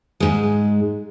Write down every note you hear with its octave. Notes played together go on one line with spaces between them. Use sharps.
G#2 G#3